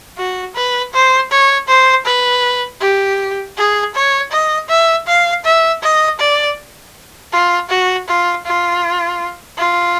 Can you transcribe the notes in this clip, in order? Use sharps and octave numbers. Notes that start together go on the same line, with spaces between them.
F#4
B4
C5
C#5
C5
B4
G4
G#4
C#5
D#5
E5
F5
E5
D#5
D5
F4
F#4
F4
F4
F4